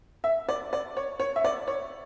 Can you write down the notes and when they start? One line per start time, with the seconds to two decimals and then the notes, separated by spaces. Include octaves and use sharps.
0.24 E5
0.49 D5
0.73 D5
0.97 C#5
1.20 C#5
1.36 E5
1.44 D5
1.68 C#5